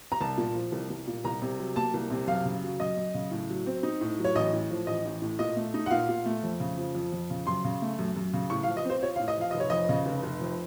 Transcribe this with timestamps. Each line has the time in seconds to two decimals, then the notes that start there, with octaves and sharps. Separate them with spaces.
0.12 A#5
0.21 C2 A5
0.38 A#2
0.55 F3
0.72 C2
0.90 C2
1.07 A#2
1.24 C2 A#5
1.42 C3
1.58 F#3
1.76 A#3 A5
1.94 C2
2.11 C3
2.27 F#2 F5
2.45 C#3
2.63 F#3
2.80 F#2 D#5
2.97 F#2
3.14 C#3
3.31 A2
3.50 F#3
3.66 C4
3.83 D#4
4.01 A2
4.19 F#3
4.24 C#5
4.35 A1 D#5
4.53 A2
4.70 F3
4.87 A1 D#5
5.05 A1
5.22 A2
5.39 A#2 D#5
5.56 A3
5.74 D#4
5.86 F#5
5.91 A#2 F5
6.09 A#2
6.26 A3
6.43 F2
6.60 C#3
6.78 F3
6.95 F2
7.12 F2
7.30 C#3
7.47 F#2 C6
7.64 C#3
7.82 A3
7.99 F#2
8.16 F#2
8.33 C#3
8.50 A2 C#6
8.63 F5
8.68 F3
8.77 D#5
8.85 C4 C5
9.02 F4 C#5
9.16 F5
9.20 A2
9.28 D#5
9.37 F3 F5
9.51 F1 D#5
9.60 C#5
9.70 F2 D#5
9.89 C#3
10.06 F1
10.23 F1
10.41 F2